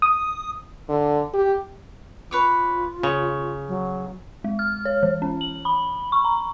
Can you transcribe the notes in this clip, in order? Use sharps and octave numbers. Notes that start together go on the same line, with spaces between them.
D#6
D3
G4
F4 B4 C#5 D6
C#3 C#5
F#3
G#3
F6
C#5
E3
C#4
F#7
B5
C#6
A#5